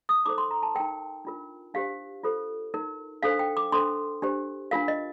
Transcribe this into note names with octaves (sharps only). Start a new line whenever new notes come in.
D#6
D#4 A4 C5 D6
C6
A#5
A5
D#4 A#4 G5
D4 F4 A#4
D4 G4 C5 F5
F4 A4 C5
D#4 A#4
D4 A4 C5 F5
G5
D6
D4 A4 C5 C6
D4 G4 C5
D4 F4 A#4 F5
D#5